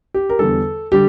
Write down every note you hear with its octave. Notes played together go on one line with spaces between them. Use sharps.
G4
A#4
E2 D3 G3 A4
D3 G3 G4